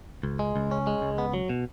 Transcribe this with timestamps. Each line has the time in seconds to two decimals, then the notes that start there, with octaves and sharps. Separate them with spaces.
0.23 C#2
0.39 G#3
0.56 C#2
0.71 C#4
0.87 G#3
1.02 C#2
1.18 B3
1.34 F#3
1.49 B2